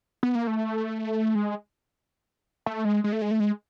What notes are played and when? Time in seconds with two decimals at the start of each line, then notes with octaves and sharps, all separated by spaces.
0.23 B3
0.35 A#3
0.47 A3
1.35 G#3
2.66 A3
2.85 G#3
3.04 G#3
3.12 A3
3.22 G#3
3.31 A3
3.40 G#3